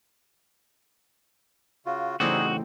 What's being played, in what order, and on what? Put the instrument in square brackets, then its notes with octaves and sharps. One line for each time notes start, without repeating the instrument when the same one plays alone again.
[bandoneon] C#3 F4 F#4
[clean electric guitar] E2 A2 C#3 [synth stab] G3 C4 D#4 [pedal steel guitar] F#4 [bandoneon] G#4